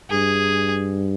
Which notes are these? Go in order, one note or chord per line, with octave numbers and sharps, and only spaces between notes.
G2 G#4